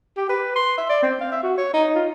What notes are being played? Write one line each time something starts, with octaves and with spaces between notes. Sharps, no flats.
G4
B4
C6
E5
D5
C4
F5
E5
F#4
C#5
D#4
F4